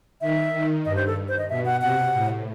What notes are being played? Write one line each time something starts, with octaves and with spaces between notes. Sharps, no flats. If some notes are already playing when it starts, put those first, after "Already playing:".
D#3 E5
D#3
G2 D#5
C5
A4
C5
D#5
B2 E5
F#5
C3 F#5
A2